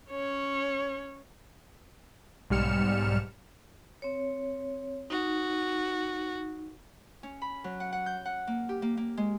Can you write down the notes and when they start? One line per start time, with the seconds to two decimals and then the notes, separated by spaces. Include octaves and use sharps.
0.11 C#4 C#5
2.50 B1 G#2 G3 F6 C#7 E7
4.02 C4 C#5
5.10 D#4 F#4
7.23 C#4
7.42 B5
7.64 F#3
7.80 F#5
7.93 F#5
8.06 G6
8.25 F#5
8.47 A#3
8.69 G4
8.82 A#3
8.97 A#3
9.17 G#3